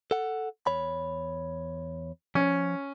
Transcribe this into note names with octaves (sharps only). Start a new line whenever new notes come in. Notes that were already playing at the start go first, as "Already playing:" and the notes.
A4 F#5
E2 C#5 B5
F3 C#4